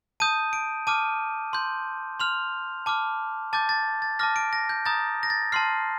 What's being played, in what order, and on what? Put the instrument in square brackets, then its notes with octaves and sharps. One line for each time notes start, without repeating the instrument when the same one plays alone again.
[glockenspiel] A5 D#6 G6 D#7
D7
A5 D6 F6 D#7
C6 G6
C6 F6 F7
A5 D6 F6
A5 D6 G6 A6
A6
A6
A5 D6 F6 A#6
D7
A#6
G6
A#5 D#6 G6 A6
A#6
A6
A5 C6 F6 C7